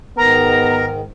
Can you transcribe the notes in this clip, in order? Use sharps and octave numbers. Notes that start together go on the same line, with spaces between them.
G#2 D#3 B3 A#4 A#5